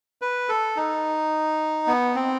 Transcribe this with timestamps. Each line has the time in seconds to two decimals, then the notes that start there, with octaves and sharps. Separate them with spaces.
0.22 B4
0.49 A4
0.76 D#4
1.87 B3
2.15 C4